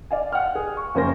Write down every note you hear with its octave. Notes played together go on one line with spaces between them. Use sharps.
D5 F5 G#5
F#5 G5 F6
G#4
C#6
F#1 F3 C#4 A#4 C5 A#6